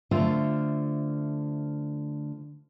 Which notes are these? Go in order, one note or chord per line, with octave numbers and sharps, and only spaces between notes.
D3 A3 F4 C5 E5